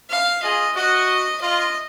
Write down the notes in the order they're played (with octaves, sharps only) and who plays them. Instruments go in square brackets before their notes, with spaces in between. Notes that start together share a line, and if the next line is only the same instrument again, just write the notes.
[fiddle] F5
[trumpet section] F4 G#4 [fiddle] D#5
[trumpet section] F#4 [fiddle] D#5
[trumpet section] F4 [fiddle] D#5